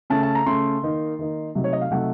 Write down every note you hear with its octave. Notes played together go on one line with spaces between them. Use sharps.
C#3 A3 C#4 A5
A5
A#5
C#3 A3 C#4 C6
D#3 A#3 D#4
D#3 A#3 D#4
C3 F#3 A3 D#4
C#5
D#5
F5
C3 F#3 A3 D#4 F#5